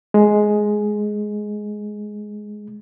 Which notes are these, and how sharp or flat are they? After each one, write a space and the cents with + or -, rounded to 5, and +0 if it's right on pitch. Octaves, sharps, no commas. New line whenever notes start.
G#3 +10